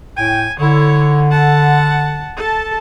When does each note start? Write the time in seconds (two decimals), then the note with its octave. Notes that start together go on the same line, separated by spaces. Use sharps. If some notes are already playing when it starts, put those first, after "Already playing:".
0.17 A2 G5 G#5
0.59 D3 E4 C#5
1.31 F#5 A5
2.36 A4 A5